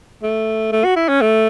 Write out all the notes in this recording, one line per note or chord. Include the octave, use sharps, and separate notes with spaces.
A3
A3
F#4
E4
C#4
A3